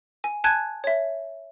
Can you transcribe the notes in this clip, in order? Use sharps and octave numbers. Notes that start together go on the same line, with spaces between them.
G#5
G#5 A5 F#6 G#6
C#5 E5